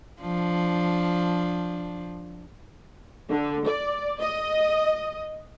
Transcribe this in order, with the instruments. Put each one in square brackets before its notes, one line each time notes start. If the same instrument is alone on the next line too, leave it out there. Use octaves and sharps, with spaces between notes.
[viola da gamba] F3 D4
[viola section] D3
D5
D#5